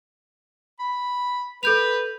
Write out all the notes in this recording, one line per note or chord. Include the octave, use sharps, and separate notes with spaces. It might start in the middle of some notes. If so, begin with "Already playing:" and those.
B5
A4 B4 G6 F7